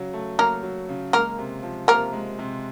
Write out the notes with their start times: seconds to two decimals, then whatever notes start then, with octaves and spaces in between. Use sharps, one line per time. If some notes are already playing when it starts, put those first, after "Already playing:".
Already playing: C#3 F#3
0.13 A3
0.39 F#3 A#3 A#4
0.63 F#3
0.89 C#3
1.13 G#3 A#3 A#4
1.38 C3
1.63 F3
1.88 C3 A#3 A#4
2.13 G#3
2.39 C3